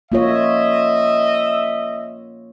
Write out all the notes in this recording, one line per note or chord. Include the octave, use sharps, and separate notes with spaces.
A#3 F4 C#5 D#5 E5